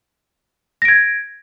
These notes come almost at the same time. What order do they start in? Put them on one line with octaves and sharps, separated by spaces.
A#6 D7 G#6